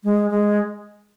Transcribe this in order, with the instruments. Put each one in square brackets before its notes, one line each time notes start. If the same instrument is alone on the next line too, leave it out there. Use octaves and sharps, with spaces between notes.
[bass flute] G#3
G#3